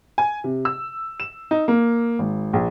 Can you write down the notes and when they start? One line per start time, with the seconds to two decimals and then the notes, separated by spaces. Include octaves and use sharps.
0.18 G#5
0.44 C3
0.65 E6
1.20 E7
1.51 D#4
1.68 A#3
2.19 G#1
2.53 A#1